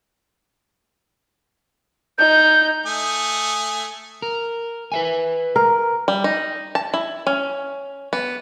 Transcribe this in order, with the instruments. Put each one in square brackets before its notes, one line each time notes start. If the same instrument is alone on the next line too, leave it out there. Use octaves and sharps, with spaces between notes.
[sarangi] D#4 [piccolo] G6
[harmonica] A3 G#5 D#6
[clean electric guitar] A#4
B4 E5 G#5
[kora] A#4
[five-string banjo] G3
D#4
A5
E4
C#4
B3